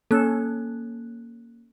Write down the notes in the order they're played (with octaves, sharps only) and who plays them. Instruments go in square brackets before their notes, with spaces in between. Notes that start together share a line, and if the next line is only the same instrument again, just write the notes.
[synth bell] A#3 F#6 [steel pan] C#4 A4